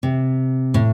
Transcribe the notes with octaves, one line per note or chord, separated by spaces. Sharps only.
C3
A2